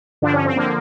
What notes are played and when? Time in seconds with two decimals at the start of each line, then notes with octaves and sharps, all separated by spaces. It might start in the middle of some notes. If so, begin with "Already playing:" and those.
0.22 G2 D3 F3 D4
0.33 C#4
0.45 C4
0.56 D3 F3 A#3